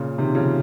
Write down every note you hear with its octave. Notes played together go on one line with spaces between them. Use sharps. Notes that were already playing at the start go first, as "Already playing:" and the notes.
Already playing: A#2 C#3
C3 D#3
C#3 F3